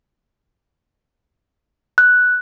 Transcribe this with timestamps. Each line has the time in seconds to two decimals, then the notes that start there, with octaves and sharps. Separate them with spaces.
1.98 F#6